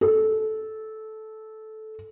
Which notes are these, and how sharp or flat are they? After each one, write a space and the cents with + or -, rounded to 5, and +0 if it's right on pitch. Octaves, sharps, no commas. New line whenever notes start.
A4 -15